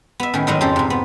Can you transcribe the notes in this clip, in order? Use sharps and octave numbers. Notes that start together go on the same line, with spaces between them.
B3 E5
A2 D#3 C#4
G#2 D#3 F#3 D#4 E4 D#5
F2 C#3 G4 A4 C5 A#5
G#2 C3
B3